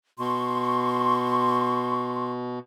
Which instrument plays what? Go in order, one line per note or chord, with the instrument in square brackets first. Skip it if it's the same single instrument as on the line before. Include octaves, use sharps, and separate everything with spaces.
[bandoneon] B2 [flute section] C6 C#6